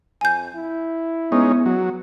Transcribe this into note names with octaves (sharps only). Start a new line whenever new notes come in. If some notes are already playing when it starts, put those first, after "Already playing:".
F2 G#5 G6
E4
G#3 B3 C#4 D#4
F#3